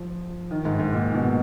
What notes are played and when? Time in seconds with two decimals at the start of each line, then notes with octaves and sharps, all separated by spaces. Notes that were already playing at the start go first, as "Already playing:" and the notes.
Already playing: F3
0.51 D#3
0.65 G#2
0.80 G#2
0.93 A#2
1.14 B2